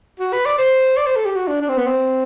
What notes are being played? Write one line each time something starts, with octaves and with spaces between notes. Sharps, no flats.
F#4
B4
D5
C5
D5
C5
A4
G4
F#4
D4
D4
C4
B3
C4